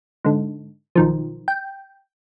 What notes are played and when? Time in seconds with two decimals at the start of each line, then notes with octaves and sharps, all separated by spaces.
0.25 G#2 D3
0.95 B1 D#3 F3
1.48 G5